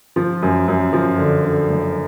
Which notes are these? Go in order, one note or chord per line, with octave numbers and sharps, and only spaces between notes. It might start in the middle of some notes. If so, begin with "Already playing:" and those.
F3
F#2
F#2
F3
D3
D3
F#1